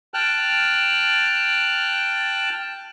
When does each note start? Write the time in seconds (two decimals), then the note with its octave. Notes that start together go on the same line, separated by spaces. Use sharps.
0.14 G5 A5 F6 F#6